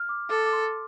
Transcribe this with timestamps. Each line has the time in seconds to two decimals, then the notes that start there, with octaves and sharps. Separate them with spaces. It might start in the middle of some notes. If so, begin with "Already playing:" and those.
Already playing: F6
0.09 D6
0.30 A4 D6
0.46 D6
0.53 C6